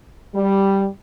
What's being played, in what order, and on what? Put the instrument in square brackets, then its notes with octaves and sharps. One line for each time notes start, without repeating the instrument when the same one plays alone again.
[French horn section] G3